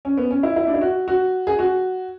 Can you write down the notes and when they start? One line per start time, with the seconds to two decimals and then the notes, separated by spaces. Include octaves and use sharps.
0.05 C#4
0.18 B3
0.31 C#4
0.43 E4
0.56 E4
0.67 D4
0.74 E4
0.81 F#4
1.08 F#4
1.47 G#4
1.59 F#4